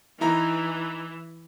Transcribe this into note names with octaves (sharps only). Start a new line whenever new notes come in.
E3 D#4 E4 A#5